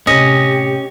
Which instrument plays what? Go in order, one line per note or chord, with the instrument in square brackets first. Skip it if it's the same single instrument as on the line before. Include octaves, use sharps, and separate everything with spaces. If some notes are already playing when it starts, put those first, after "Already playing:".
[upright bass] A2 C3 [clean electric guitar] C#4 [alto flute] G4 [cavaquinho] D#5